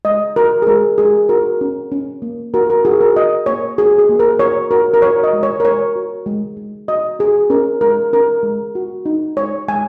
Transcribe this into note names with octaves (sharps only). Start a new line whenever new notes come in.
G#3 D#5
F#4 A#4
G#4
G#3 A#4
G#3 G#4
F#4 A#4
C#4
C#4
A#3
F#4 A#4
A#4
F#4 G#4
A#4
F#4 D#5
A#3 C#5
F#4 G#4
G#4
A#3
A#4
F#4 C#5
F#4 A#4
A#4
F#4 C#5
D#5
G#3
C#5
A#4
G#3 C#5
F#4
G#3
G#3
F#4 D#5
F#4 G#4
C#4 A#4
G#3 A#4
C#4 A#4
G#3
F#4
D#4
G#3 C#5
G#3 G#5